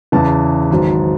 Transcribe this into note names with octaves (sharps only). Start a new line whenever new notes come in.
E2 C#3 E3 A5
G#1 G#2 F#3